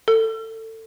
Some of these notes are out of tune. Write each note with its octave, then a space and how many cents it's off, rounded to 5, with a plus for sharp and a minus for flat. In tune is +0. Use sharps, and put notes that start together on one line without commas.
A4 +25